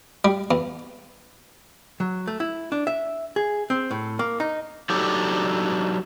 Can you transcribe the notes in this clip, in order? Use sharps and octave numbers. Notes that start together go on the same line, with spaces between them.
G3
E2
F#3
A3
E4
D4
E5
G#4
C4
A2
A#3
D#4
F#3 D4 D#4 G4 A4 D5